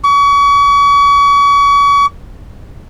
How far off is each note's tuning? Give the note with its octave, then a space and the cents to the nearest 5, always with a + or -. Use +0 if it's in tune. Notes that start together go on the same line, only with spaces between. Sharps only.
C#6 +35